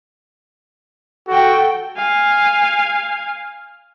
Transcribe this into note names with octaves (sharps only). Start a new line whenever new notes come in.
F#4 A4 G5
F5 G#5